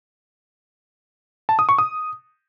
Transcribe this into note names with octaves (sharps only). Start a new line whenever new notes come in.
A5
D#6
C#6
D#6